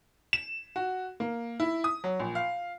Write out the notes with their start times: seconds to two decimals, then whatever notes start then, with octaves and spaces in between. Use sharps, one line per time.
0.33 E7
0.76 F#4
1.20 A#3
1.60 E4
1.84 D#6
2.04 F#3
2.20 A#1
2.35 F5